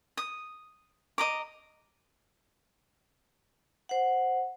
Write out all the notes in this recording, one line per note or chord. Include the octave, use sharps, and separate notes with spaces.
D#6
D#5 A#5 D6
C5 F#5